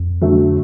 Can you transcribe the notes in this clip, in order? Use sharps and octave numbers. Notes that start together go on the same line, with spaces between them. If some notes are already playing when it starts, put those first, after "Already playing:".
Already playing: F2
D3 F#3 A3